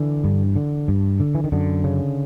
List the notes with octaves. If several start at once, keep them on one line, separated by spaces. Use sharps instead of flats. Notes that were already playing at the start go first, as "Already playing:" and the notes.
Already playing: D3 E3
G2
D3
G2
D3
E3
D#3
F#2 D3
C#3